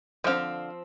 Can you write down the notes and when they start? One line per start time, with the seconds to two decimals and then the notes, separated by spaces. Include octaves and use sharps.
0.24 D3 F3 C4 F5